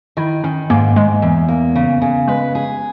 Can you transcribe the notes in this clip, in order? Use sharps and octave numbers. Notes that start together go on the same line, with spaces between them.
D#3 E4
D#3 C#4
G#2 A#3
G#2 G#3
E2
A#3
C#3
C#3
G#3 B4
G#4